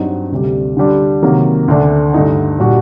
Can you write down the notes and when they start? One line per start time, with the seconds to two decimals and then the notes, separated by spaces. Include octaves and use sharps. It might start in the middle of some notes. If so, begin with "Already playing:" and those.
Already playing: G2 F#3 C4 D#4 F#4
0.32 D2 C3 G3
0.77 D3 G3 D4
1.22 C3 D#3 F#3 A#3
1.68 D2 D3 A3 D4
2.14 G2 D3 A3 D#4
2.58 A#2 G3 D4 F#4